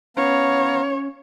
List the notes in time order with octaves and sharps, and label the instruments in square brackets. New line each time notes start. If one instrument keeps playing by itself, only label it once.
[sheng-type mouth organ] B3 F5 A#5 [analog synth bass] C#4 [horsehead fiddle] C#5